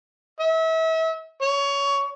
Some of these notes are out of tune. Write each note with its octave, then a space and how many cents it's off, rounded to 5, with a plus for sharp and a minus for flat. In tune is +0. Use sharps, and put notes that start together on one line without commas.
E5 -35
C#5 +20